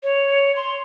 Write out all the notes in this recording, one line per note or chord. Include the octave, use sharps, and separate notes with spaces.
C#5
C6